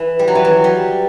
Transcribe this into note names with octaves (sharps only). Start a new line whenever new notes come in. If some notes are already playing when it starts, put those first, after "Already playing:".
Already playing: E3
G3
F#3
E3
F#3
G3